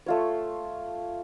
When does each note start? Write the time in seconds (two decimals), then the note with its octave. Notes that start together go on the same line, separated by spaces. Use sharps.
0.06 A3 F4 C#5